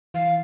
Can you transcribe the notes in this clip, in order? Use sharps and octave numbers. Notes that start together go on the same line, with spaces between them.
E3 F5